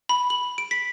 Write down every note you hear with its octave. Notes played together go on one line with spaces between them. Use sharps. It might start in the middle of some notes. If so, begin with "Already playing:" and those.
B5
F#7
D7
B6